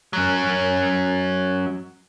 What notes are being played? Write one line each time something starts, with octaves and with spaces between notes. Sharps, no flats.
F#3 C#4